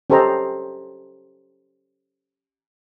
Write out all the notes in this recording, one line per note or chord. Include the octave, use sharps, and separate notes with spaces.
C#4 G4 A4 C5 D#5 A#5